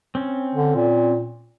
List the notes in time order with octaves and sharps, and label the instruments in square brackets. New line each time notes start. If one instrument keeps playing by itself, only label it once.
[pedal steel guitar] C4 C#4
[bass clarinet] D3
A#2